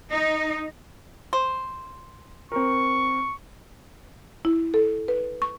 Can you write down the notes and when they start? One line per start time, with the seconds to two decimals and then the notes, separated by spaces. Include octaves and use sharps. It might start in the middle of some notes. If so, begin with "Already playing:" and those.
0.10 D#4
1.33 C5
2.52 C4 A#4 C#6
4.45 E4
4.74 A4
5.08 B4
5.42 C#6